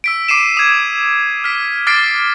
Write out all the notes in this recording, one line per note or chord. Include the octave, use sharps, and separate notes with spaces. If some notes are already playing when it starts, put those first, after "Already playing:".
E6 B6 D7
D6 C7 D#7 E7
D#6 G#6
F6 B6
D6 F6 A6 B6 C7 D7